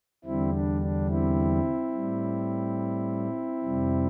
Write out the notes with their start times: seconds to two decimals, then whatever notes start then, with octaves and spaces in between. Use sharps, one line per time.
0.25 E2 D3 G3 C4 E4
0.52 D4
0.82 D4
1.09 C4 E4
1.93 A2 G3
3.63 F2 C3 G3